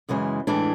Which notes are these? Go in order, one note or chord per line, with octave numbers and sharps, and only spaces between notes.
F#2 C#3 E3 G#3
A2 E3 G#3 D4